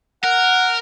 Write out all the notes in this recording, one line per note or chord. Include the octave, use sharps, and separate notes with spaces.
A#4 F#5